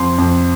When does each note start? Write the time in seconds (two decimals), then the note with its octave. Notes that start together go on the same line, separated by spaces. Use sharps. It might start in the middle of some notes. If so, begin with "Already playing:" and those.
Already playing: F2 C6
0.18 F2